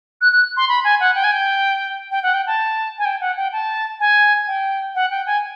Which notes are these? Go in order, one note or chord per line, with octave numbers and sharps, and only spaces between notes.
F#6
F#6
C6
B5
G#5
F#5
G5
G#5
G5
G5
F#5
G5
A5
G#5
G5
F#5
G5
A5
G#5
G5
F#5
G5
G#5